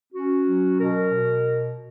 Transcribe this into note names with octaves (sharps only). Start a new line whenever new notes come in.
C#4 F#4
F#3
B2 A#4
B2